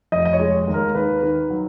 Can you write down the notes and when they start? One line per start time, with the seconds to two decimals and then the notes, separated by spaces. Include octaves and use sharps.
0.12 F1 D#5
0.25 D#5
0.33 C#5
0.40 G#3
0.67 D#2
0.74 A#4
0.95 D#3 B4
1.23 D#3
1.50 F#3